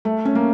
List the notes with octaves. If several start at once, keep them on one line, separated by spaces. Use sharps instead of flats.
A3
C#4
A#3